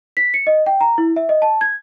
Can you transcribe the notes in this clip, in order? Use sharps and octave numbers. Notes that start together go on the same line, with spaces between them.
B6
C#7
D#5
G5
A#5
E4
E5
D#5
A5
G#6